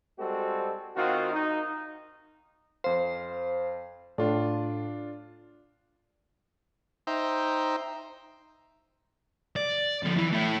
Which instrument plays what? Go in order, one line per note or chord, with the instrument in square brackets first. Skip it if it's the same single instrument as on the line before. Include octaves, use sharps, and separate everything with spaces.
[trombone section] G3 G#3 C4 F#4 A4
D#3 C4 F4 F#4
D#4
[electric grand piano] F2 F5 [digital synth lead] C5
[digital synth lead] A2 [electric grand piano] D4 F4 D5
[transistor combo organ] D#4 C5 E5 G5 A#5
[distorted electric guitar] D5
F2 D3
E3
A3 E4